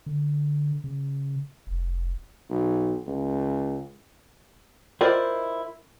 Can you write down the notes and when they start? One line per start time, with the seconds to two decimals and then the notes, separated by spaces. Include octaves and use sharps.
0.06 D3
0.84 C#3
1.67 F1
2.50 B1
3.07 C#2
5.01 E4 F4 A#4 C5 D5 D#5